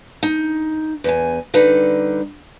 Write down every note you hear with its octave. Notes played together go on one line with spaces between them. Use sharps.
D#4
E2 G#5
D3 G3 D#4 B4